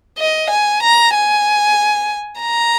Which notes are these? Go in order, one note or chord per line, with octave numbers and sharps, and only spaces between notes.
D#5
G#5
A#5
G#5
A#5